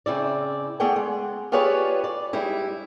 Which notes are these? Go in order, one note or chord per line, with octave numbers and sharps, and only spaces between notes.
C#3 C4 E4 D5
A3 B3 G#4 D5 F#5 G5
G#3
F4 G4 G#4 B4 C#5 D5
D5
G3 G#3 D#4 E4